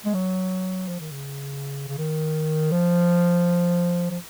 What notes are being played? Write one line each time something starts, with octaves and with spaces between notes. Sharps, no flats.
G#3
F#3
F3
D#3
C#3
C#3
D#3
F3
F3